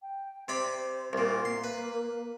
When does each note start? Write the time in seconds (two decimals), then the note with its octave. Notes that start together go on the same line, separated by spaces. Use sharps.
0.02 G5
0.48 C3 C5 D5 B5
1.13 C2 A#2
1.45 A#3 C6
1.64 B4